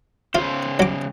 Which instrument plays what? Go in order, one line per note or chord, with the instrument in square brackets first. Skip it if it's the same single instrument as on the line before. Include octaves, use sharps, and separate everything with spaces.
[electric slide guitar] C#3 C5 [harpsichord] F4
[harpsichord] F#3 D6